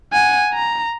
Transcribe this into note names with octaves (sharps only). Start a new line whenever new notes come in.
F#5 G#5
A#5